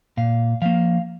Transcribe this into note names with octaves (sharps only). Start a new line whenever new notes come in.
A#2 F5
F3 A#3 F5